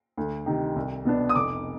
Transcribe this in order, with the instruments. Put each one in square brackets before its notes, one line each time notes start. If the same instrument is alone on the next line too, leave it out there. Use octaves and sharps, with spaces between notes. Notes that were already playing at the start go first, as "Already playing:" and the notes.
[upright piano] D2
C3 D#3
C2
B2 B3 D4
D#6
F1 D6